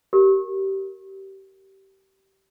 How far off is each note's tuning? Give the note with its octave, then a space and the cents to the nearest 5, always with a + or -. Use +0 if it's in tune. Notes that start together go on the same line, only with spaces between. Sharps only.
G4 -25 A#4 +0